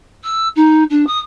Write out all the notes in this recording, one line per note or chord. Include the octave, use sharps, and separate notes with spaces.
E6
D#4
D4
D#6